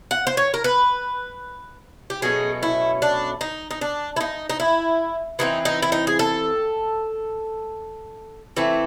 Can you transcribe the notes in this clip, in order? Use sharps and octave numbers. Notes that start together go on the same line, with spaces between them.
F#5
C5
C#5
A#4
B4
G4
B2 F#3 A3 C#4 G#4
E4
D4
D#4
D#4
D4
E4
D#4
D#4
E4
E3 A3 C4 D#4
D#4
E4
D#4
G#4
A4
E3 A3 C4